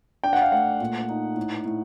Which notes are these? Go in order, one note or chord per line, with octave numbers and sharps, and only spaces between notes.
D4 G5
F#5
F5
A3 F#5
A#2
D#4
A2
A2